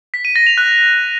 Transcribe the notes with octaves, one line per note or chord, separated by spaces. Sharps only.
B6
D#7
A#6
F7
F#6